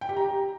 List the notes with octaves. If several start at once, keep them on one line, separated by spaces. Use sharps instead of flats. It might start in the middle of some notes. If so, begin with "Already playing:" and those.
G5
G4
A#5
G4